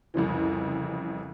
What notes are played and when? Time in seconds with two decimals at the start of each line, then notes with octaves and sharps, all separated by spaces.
0.14 C2 F2 C#3 E3